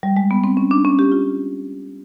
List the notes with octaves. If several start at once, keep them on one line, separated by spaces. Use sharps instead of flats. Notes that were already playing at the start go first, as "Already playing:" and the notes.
G3
G#3
B3
C4
C#4
D4
C#4
G4
F4